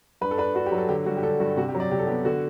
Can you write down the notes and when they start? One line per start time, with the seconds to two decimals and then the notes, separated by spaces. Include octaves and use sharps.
0.21 G2 B4
0.31 A4
0.38 D4 B4
0.55 D4 F#4
0.66 G4
0.72 F#3
0.78 A4
0.89 D3 G4
1.06 G3 F#4
1.17 G4
1.23 D3 A4
1.40 G2 F#4
1.57 C3 F#4
1.69 G4
1.75 F#3
1.80 D5
1.91 C3 G4
1.99 A4
2.07 B3 G4
2.25 D3 F#4